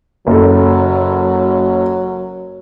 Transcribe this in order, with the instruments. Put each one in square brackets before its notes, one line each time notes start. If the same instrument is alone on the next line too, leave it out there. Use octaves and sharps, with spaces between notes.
[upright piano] F#1 A4 [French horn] F#3